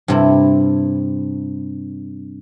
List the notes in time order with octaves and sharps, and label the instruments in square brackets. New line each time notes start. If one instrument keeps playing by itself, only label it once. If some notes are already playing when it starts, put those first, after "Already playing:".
[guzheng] G2 C3 E4